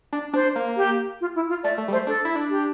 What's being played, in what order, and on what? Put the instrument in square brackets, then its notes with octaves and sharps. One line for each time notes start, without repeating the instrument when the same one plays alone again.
[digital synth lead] D4
[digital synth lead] D4 [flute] C5
[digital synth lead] A#3
[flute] G4
F4
E4
F4
[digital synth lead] A3 [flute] D5
[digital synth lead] A3
G3
[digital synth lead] A3 [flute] C5
[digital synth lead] D4 [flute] A4
[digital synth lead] E4
D4
[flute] G4